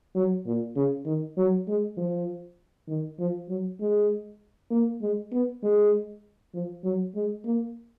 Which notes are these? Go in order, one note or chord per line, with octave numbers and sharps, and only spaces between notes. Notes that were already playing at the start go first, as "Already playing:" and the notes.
F#3
A#2
C#3
D#3
F#3
G#3
F3
D#3
F3
F#3
G#3
A#3
G#3
B3
G#3
F3
F#3
G#3
A#3